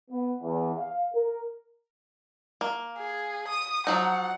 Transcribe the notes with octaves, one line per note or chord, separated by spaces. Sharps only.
B3
E2
F5
A#4
A#3
G#4
D#6
F3 F#3 D#4 F#5